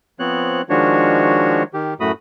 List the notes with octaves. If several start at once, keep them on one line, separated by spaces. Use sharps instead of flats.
F3 B3 C4 C#5 F#6
D#3 F3 G#3 D4 F#4 C#5
D#3 G4
F#2 A2 A3 F#4 B5 D#6